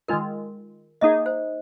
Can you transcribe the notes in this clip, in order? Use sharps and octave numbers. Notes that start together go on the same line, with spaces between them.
D#3 G#3 F4 A#4
A#3 D#4 G#4 D#5
C5